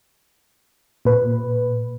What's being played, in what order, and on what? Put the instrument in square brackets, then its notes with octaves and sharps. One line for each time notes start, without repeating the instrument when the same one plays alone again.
[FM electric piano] A#2 B4